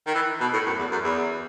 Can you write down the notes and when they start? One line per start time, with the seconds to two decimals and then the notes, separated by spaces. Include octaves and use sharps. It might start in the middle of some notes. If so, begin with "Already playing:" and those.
0.06 D#3
0.15 E3
0.41 B2
0.53 A2
0.66 F#2
0.78 E2
0.91 F#2
1.03 E2